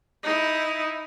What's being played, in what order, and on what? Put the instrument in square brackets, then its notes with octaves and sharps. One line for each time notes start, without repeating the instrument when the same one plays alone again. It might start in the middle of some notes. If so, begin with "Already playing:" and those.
[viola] D#4 E4